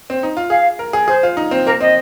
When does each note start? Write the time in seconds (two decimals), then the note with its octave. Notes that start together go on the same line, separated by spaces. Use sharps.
0.10 C4
0.23 D#4
0.37 F4
0.50 G#4 F5
0.79 A#4
0.93 G#4
1.08 G#4 C5
1.23 F4
1.37 D#4
1.51 C4
1.66 A#3 A#4
1.80 C4 D#5